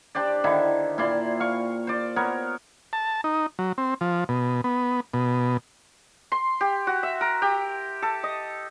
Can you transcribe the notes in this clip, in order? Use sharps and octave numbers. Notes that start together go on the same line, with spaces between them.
D4 G4 C5 D5
D3 D#3 E4
A#2 E4 D5 C6
F5 C#6
C5 D5
B3 A#4 C#5
A5
D#4
F#3
C4
F3
B2
B3
B2
C6
G4
F#4
E5
A#4
G4
A4
D#5